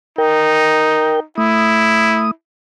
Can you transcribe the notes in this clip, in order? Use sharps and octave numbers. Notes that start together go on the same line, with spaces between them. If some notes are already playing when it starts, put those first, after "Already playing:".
D#4 A#4 G5
A3 E4 D#6